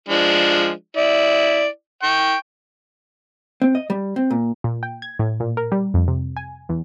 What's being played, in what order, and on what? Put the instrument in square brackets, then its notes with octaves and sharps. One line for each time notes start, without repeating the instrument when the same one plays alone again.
[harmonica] F3 G#3 D4
E4 D5
G5 C#6
[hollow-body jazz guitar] C4
D#5
G3
C4
A#2
[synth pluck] A#2
G5
G#6
A2
A#2
A#4
G3
F2
C3
G#5
E2